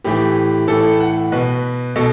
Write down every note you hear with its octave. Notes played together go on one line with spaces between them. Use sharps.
A2 E3 G4
A2 E3 A4
F#5
B2 B4
B2 A4